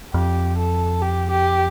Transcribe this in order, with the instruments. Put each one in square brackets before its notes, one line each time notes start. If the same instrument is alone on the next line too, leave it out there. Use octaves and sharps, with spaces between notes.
[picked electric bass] F2 [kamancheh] G4
[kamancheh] A4
G4
G4